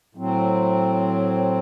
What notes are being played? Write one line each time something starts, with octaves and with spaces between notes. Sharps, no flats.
A2 F#3 C4